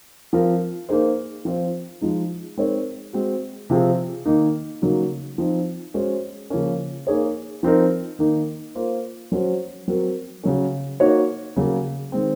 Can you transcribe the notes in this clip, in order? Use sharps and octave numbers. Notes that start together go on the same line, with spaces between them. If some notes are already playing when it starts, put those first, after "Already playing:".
F3 C4 F4 A#4
A#3 D#4 G#4 C5
F3 C4 F4 C5
F3 G#3 D#4
G#3 C4 D#4 A#4 C#5
G#3 C4 F#4
C3 F3 C4 F4 G#4
D#3 A#3 D#4
C#3 F#3 A#3 D#4 F#4
F3 C4 D#4
G#3 C#4 F#4 C5
C#3 F3 A#3 C#4
A#3 D#4 G#4 C#5
F3 C4 D#4 A#4
D#3 A#3 D#4
A#3 F4 C5
F#3 C#4 F#4 C5
F#3 C4 F#4 A#4
C#3 F#3 C#4
A#3 D#4 F#4 C#5
C#3 F#3 A#3
D#3 G#3 C4